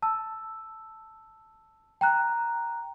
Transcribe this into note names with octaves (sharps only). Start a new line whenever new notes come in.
A5 E6
G5 A#5 F#6